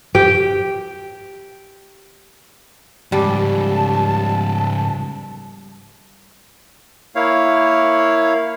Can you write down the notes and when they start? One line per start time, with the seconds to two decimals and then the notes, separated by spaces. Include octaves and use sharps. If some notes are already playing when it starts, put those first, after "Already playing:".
0.15 G4 G5
3.12 G#2 C#3 G3 A5
7.15 A#3 E4 C#5 F5